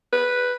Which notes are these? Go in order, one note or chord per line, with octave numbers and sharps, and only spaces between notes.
B4